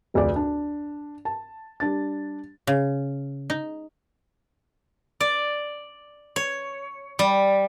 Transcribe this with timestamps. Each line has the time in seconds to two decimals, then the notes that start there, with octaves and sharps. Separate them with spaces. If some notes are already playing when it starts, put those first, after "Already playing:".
0.14 F1 D2 G#4 D5
0.36 D4
1.25 A5
1.80 G3 D4 A6
2.67 C#3
3.50 D#4
5.20 D5
6.36 C#5
7.19 G3